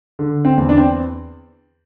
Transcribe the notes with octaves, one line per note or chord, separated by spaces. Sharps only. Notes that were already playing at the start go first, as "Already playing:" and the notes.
D3
C4
E2
D4
C4